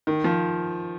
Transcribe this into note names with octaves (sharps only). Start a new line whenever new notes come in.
D#3
F3